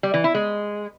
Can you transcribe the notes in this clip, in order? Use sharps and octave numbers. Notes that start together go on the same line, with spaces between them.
G3
E3
E4
G#3